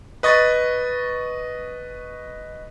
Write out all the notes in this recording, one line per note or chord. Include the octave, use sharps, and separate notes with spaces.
B4 D#5 C#6 A6